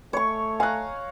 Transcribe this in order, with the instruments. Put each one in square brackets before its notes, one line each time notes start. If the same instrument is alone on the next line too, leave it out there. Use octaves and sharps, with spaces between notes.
[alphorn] A3 [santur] C#5 C#6
[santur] F5 A#5 [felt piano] G#5 F#6